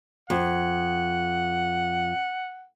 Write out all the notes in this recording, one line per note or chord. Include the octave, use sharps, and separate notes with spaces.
F2 F#5